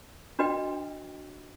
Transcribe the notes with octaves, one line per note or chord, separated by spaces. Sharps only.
D4 F#4 B4 D#5 G5